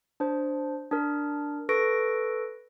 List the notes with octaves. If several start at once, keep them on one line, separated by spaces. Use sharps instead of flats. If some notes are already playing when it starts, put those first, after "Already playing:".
D4 C5
D4 A#4
A4 B4 C#6 A#6 D7